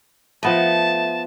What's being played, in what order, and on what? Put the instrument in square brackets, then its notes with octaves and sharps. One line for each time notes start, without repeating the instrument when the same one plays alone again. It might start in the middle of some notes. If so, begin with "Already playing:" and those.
[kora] F3 B3 D#5 [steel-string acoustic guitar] A3 [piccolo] A5